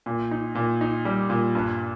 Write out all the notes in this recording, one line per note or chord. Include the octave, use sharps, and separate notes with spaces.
A#2
D#4
A#2
D#4
G3
A#2
G2